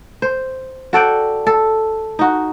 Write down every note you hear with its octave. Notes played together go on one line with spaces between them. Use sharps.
C5
F#4 A4 D5 G5
A4
D#4 F#4